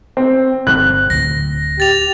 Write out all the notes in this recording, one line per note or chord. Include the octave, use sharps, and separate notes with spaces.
C4
G1 E3 C4 F#6
D1 G#1 D2 A#6
G4 A6 F7